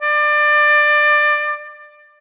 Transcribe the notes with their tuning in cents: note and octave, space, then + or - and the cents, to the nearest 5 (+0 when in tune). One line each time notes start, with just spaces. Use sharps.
D5 +25